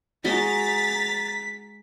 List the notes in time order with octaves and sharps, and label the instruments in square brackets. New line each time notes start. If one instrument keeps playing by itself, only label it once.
[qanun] G#3 F#4 D#5 [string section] A#5 A6 [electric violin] B6